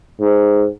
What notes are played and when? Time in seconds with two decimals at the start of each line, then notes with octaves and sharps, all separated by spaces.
0.20 G#2